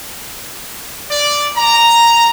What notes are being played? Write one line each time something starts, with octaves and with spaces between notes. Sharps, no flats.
D5
A#5